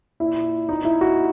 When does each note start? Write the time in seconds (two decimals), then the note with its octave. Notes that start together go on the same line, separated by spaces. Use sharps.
0.20 A#2 E4
0.69 A#2 D#4
0.85 E4
1.01 F#4